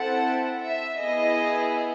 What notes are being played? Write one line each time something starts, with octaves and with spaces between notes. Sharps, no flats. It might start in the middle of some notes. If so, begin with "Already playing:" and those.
Already playing: C4 E4 A4 F#5
E5
B3 E4 G#4 D#5